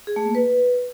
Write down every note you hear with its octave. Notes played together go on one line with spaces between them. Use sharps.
G#4
A3
A#3
B4